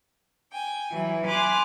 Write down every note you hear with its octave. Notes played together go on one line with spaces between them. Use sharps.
G5 G#5
E3 F#3 E4
G#5 B5 C6 D6 F6 F#6